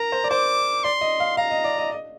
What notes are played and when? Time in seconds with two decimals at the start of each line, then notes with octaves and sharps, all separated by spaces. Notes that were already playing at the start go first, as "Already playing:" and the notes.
Already playing: A#4 A#5
0.12 C5
0.24 D5
0.30 C5 D6
0.84 D5 C6
1.01 D#5
1.20 F5
1.37 F5 A#5
1.51 D#5
1.64 D5
1.78 D#5
1.92 D#5